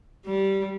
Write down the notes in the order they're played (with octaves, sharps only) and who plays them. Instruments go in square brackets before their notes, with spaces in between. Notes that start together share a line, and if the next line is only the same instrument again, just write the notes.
[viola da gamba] G3